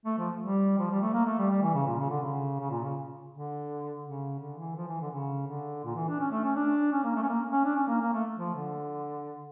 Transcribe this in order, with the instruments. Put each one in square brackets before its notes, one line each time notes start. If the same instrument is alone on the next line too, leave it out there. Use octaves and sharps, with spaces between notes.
[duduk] A3
F3
G3
F3
G3
A3
A#3
A3
G3
G3
E3
C#3
A#2
C#3
D3
C#3
C#3
A#2
C#3
D3
C#3
D3
E3
F3
E3
D3
C#3
D3
A#2
E3
D4
C#4
A3
C#4
D4
C#4
A#3
A3
C#4
A#3
C#4
D4
C#4
A#3
A#3
A3
F3
D3